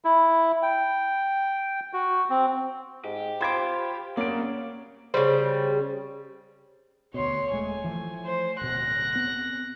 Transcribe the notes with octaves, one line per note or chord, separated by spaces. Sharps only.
E4
G5
F#4
C4
G#2 G4
F4 C5 B5 D6 G#6
C#3 F#3 A#3 D5 D7
C#3 G3 C5
D2 B2 C#5 C6
D#1 G#3 A3 G#5
E3 F3 A3
C5
D1 B2 F#6 A#6
B3 C4